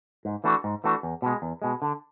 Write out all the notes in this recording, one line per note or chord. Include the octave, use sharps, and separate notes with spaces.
G#2
E3 A3 D4 F#4
G#2
E3 A3 D4 F#4
E2
B2 G#3
E2
B2 G#3
D3